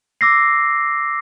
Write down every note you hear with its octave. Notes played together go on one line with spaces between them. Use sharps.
D6 E6 A#6 C7